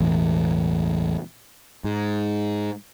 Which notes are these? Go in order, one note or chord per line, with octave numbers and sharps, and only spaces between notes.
E1 A1 E2
G#2